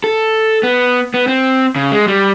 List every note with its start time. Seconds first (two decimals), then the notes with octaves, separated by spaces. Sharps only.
0.04 A4
0.63 B3
1.14 B3
1.28 C4
1.76 C#3
1.92 G#3
2.08 G3